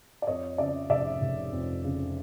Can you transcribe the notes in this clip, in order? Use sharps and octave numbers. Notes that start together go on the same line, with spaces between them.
D5
F2 C#5 D#5
C#3 D5 E5
F1 D5 E5
F1
F2
C#3